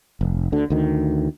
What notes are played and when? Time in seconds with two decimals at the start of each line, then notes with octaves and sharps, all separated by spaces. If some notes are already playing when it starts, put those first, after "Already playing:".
0.21 F1
0.52 D2 D3
0.70 D2 D#3